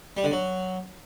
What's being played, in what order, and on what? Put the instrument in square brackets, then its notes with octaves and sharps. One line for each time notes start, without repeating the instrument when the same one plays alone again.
[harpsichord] G3
D3
F#3